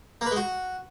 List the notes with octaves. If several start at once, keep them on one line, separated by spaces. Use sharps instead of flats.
A#3
B4
G#3
F#4